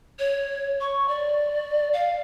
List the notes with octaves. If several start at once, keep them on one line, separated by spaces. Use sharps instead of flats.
C#5
C#6
D5
F5